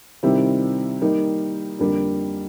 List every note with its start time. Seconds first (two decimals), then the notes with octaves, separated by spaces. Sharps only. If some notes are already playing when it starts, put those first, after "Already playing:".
0.23 C3 D#3 G3 C4 E4
1.01 D#3 G3 A#3 D#4
1.79 F2 D3 G3 A#3 D4